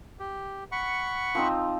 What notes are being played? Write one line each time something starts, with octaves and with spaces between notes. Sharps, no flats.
G4
F#5 B5 C#6
F3 C4 D#4